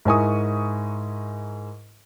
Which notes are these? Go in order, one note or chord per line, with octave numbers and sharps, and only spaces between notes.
G#2 E4 A#4 G#5 C#6 D#6